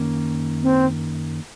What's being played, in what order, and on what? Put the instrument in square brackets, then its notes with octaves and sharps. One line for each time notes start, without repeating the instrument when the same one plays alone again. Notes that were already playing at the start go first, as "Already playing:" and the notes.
Already playing: [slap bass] F#2 D#3 A#3 C#4
[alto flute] C4